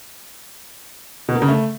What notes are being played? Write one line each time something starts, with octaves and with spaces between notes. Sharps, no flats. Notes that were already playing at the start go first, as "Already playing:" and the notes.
B2
A#3
C#3
A3